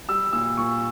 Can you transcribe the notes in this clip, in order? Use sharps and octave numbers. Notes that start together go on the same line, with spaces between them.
G3 E6
A#2 E6
A#2 C#6